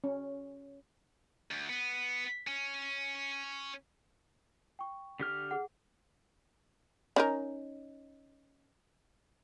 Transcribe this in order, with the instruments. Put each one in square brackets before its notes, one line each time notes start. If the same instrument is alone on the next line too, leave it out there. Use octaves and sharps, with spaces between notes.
[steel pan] C#4
[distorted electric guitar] D2
B3
C#4
[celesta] G5 C#6
[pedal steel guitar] D3 G4 F6
[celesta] G#4 F#5
[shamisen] C#4 D#4 A#4